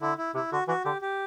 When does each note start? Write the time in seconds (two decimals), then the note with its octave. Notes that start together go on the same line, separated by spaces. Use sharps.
0.01 D3 E4
0.18 E4
0.34 C3 E4
0.52 D3 F#4
0.68 E3 F#4
0.84 D3 G4
1.02 G4